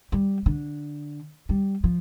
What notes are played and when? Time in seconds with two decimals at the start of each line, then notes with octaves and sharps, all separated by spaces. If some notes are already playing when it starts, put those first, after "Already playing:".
0.12 G3
0.46 D3
1.49 G3
1.84 F3